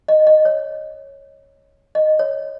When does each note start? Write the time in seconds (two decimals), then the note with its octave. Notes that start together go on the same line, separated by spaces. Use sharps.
0.08 D#5
0.27 D#5
0.45 C#5
1.95 D#5
2.19 C#5